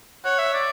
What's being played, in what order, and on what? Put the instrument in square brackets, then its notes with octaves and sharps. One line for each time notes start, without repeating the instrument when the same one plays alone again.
[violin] C#5 [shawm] F#5
[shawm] E5
D5